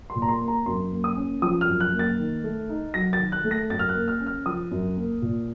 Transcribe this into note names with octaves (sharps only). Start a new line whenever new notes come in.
C6
A#2
A#5
C6
A#3
A#5
F#2 C6
A#3
D#6
C#4
F3 D#6
F6
F#2
F#6
A#3
A6
D#3
A3
D#4
F#3 A#6
A6
D#3
F#6
A3
A#6
F#2 A6
F6
F#6
A#3
F6
C#4
F6
F3 D#6
F#2
A#3
A#2